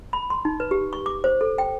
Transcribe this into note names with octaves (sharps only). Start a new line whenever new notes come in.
B5
C6
D#4
B4
G4
C#6
D6
C5
A4
G5